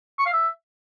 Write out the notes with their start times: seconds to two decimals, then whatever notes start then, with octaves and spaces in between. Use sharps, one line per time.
0.19 C#6
0.26 F5
0.33 E5